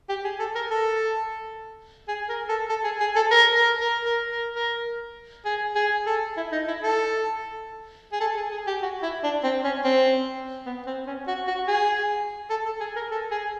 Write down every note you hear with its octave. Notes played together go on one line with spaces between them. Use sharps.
G4
G#4
A4
A#4
A4
G#4
A#4
A4
A4
G#4
G#4
A4
A#4
A#4
A#4
A#4
A#4
A#4
G#4
G#4
A4
E4
D#4
E4
A4
G#4
A4
G#4
G#4
G4
F#4
E4
D4
C4
C#4
C4
B3
C4
C#4
F#4
F#4
G#4
A4
A4
G#4
A#4
A4
G#4